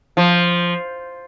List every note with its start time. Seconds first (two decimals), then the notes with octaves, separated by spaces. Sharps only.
0.17 F3